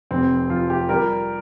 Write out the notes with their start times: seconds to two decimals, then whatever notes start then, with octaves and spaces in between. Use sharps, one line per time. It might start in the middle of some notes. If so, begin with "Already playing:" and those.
0.11 F1 C4
0.49 F3 F4
0.70 G4
0.89 G3 A#4